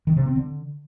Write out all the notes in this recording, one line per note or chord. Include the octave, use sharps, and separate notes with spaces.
D#3
C3
C4
D3